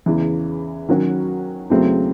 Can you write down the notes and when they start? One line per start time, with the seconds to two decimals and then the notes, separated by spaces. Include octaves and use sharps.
0.06 E2 C#3 E3
0.89 D#3 F#3 C#4 F#4
1.70 E2 C#3 F#3 A3 C4